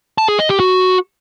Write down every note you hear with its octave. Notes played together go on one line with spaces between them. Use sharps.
A5
G#4
D#5
G4
F#4